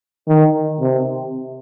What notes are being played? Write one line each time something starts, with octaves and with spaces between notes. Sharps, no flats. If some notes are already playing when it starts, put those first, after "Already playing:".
D#3
C3